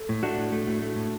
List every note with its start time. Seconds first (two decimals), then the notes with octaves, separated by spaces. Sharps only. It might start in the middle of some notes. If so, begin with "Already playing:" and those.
Already playing: A4
0.09 A2
0.23 A3 D4 F#4
0.38 A2
0.52 A3
0.67 A2
0.82 A3
0.96 A2